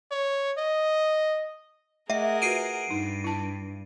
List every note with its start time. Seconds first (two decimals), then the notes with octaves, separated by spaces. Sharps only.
0.11 C#5
0.58 D#5
2.10 A3 G#4 A#4 D#5 E5 F#5
2.42 F4 F#4 B4 C7 D7 D#7
2.90 G2 D#4
3.24 E4 A5